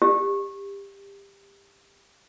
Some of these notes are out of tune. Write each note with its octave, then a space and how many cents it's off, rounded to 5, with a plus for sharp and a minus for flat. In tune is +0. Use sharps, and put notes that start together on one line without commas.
G4 +20